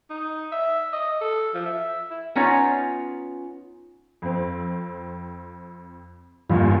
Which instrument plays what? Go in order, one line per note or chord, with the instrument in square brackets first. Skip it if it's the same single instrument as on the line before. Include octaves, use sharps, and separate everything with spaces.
[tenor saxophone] D#4
E5
D#5
A4
F3
E5
E4
[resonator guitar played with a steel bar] B3 C#4 D#4 F4 C#5
[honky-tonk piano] F2 C4
[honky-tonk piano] A1 E2 A#2 [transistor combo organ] G2 F4